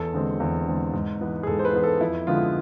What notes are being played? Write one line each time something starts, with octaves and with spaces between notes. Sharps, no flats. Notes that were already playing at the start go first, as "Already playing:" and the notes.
Already playing: E2 A4
D3 G#3 C4
E2
D3 G#3 C4
G#2
E3 B3
G#4
G#2 A4
C5
B4
E3 B3
A4
F2 E4
D3 F3 G#3 B3 F4